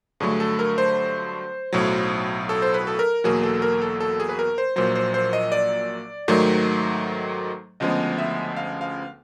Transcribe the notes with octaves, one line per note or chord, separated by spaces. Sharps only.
G2 D3 F#3 A3 G#4
A4
A#4
C5
B1 A2 F#3
A4
C5
B4
A4
A#4
E2 B2 F#3 A#3 G#4
A4
A#4
A4
A4
G#4
B4
A#4
C5
A#1 A#2 F#3 C5
C5
C5
D#5
D5
G#2 D#3 F#3 A3
D2 C#3 F3 G#3 B3 D#5
E5
F5
F5